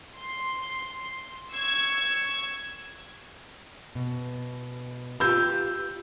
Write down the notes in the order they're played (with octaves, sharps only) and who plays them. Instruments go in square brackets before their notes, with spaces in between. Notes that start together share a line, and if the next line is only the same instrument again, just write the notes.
[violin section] C6
C#6 E6 G#6
[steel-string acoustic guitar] B2
[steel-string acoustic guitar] F4 G4 B4 [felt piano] E6 G6